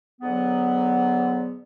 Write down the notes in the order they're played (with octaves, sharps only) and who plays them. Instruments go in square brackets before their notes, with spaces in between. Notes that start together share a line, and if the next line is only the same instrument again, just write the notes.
[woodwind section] G#2 D3 F#3 B3